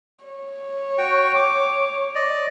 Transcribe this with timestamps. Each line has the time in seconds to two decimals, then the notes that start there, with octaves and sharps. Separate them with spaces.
0.25 C#5
0.98 F#4 G5 C#6
1.35 D6
2.15 D5 D#5